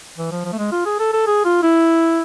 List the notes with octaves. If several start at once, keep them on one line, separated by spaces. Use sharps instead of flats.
E3
F3
F3
A3
G#3
F4
G#4
A4
A4
G#4
F4
E4